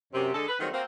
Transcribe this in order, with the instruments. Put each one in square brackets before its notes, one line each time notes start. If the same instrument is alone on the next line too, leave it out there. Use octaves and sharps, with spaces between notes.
[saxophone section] F#2 C3
D3 G#3 G#4 A4
B4
D#3 F#3 G3 A3 C4 F4
A#3 C4 F#4